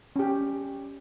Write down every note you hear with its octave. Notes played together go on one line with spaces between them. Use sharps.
C#4 G4